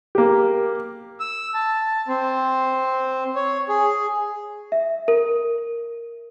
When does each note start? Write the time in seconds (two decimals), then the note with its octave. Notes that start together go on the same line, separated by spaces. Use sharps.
0.15 A#3 G4
1.20 E6
1.54 A5
2.08 C4
3.35 C#5
3.69 G#4
4.72 E5
5.08 A#4